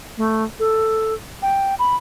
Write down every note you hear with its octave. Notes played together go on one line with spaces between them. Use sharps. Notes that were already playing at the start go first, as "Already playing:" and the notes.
A3
A4
G5
B5